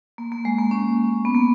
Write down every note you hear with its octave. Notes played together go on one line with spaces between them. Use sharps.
A#3
A#3
G#3
A#3
C#4
B3
A#3